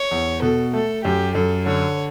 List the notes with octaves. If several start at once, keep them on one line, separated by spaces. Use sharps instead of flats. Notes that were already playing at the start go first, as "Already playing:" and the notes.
Already playing: C#5
E2
B2 A4
A3 A4
F#2 G4
F#2 A4
D3 C#5